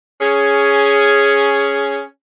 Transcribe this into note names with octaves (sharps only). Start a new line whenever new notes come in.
C#4 G#4